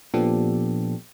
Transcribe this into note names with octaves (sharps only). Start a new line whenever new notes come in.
A#2 F3 B3 D4 G4 A4